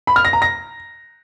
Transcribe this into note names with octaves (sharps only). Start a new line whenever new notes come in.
B5
F6
A#6
A#5
A#6